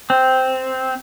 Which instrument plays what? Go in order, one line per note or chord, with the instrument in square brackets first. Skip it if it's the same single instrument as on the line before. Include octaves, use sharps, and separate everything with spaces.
[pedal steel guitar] C4